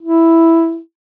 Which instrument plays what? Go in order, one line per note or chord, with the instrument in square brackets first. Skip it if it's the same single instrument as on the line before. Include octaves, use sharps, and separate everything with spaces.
[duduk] E4